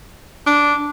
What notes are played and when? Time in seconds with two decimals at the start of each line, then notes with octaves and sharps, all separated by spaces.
0.47 D4